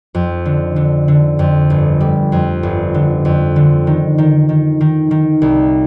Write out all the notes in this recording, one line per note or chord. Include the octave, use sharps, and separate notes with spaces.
F2
D3
D3
D3
F2
G1
G3
F2
G1
D3
F2
D3
D#3
D#3
D#3
D#3
D#3
C2